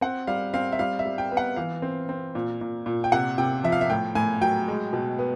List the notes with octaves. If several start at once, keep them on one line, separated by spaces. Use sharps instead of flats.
C4 F#5
G3 F5
C4 F5
E5
G3 F5
E5
G3
G5
B3
F#5
E3 F5
C4
C4
A#2
A#2
A#2
G5
C3 F#5
C3 G5
F3 E5
F5
E5
A2 G5
A2 G#5
F#3 G5
G#3
B2
B3